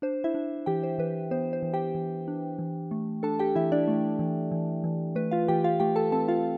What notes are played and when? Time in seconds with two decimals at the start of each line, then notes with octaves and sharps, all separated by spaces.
0.02 D4 C5
0.24 E4 E5
0.35 D4
0.66 E3 G4 G5
0.83 C5
0.98 E3 B4
1.31 B3 C5
1.53 C5
1.63 E3
1.73 G4 G5
1.95 E3
2.28 D4
2.59 E3
2.91 A3
3.23 D4 A4 A5
3.39 G4 G5
3.55 E3 E4 E5
3.72 D4 D5
3.88 A3
4.19 E3
4.52 E3
4.84 E3
5.15 A3 B4
5.31 F4 F5
5.48 E3 G4 G5
5.64 F4 F5
5.80 A3 G4 G5
5.96 A4 A5
6.12 C4 A4 A5
6.28 F4 F5